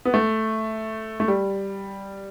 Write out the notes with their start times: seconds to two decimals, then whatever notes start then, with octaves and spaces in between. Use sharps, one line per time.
0.05 B3
0.14 A3
1.20 A3
1.28 G3